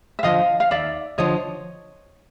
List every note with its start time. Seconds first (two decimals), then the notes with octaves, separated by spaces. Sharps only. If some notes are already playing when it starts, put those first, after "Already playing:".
0.19 E5
0.23 D3 F3 D#5 F5
0.60 F5
0.71 D#2 D5 E5
1.18 D3 F3 C#5 D#5